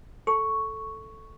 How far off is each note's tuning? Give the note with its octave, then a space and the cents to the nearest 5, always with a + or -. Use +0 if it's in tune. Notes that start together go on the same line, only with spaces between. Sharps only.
A4 +0 C#6 +0